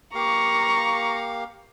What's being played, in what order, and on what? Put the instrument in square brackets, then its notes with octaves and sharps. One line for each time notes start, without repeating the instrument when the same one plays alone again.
[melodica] A#3 G4 F5 [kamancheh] A#5 C#6